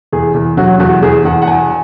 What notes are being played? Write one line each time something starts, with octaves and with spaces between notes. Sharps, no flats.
E2 G#4
E2
F#3 F#4
E2 F#4
E2 G#4
E2 F#5
F#5
E1 G#5